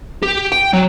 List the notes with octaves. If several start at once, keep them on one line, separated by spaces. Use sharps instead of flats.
G4
G5
F#3